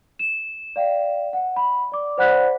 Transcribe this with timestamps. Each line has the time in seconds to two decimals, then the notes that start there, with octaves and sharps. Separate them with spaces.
0.19 E7
0.76 D5 F5 G5
1.33 F#5
1.56 B5
1.92 D5 D6
2.18 C5 D5 F#5 B5 F#6 B6